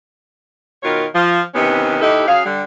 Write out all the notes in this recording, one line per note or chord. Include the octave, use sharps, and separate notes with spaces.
B2 D#3 F4 A#4 C#5
F3
C3 D#3 E3 B3 C#4
D#2 D#4 E4 G4 A4
F#3 C#4 G#4 F5
D3 G3